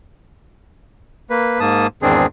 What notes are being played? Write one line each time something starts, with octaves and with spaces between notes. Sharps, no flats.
A#3 B4
G#2 A#3 A5 D#6
E2 G#2 D#3 C4 D4 G#4